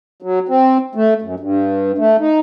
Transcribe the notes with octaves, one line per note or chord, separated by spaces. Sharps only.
F#3
C4
A3
F#2
G2
A3
D#4